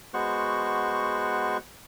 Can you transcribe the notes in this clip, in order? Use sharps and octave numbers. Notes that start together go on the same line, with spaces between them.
G#3 B3 F#4 C5 C#6 F#6